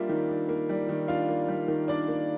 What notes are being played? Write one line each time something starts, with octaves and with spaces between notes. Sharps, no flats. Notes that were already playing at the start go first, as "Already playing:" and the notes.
Already playing: G3 A#3 D4 F4 E5
D#3
D4
A#3
G3
D#3
D4 F4 F5
A#3
G3
D#3
D4 D5
A#3